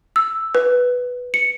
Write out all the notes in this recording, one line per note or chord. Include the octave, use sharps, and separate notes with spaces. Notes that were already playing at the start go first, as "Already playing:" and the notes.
E6
B4
C#7